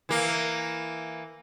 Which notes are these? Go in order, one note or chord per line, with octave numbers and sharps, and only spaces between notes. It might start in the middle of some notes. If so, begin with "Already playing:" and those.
E3 A#3